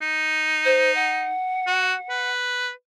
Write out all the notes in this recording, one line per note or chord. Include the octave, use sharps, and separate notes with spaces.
D#4
C5
F#5
F#4
B4